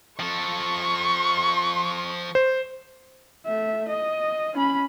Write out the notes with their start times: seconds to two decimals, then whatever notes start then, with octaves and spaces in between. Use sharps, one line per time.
0.20 F3 A4 C#6
2.35 C5
3.46 A3 E5
3.89 D#5
4.53 C#4 B5